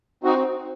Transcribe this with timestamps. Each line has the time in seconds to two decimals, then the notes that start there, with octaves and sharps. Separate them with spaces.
0.24 C4 D#4 F#4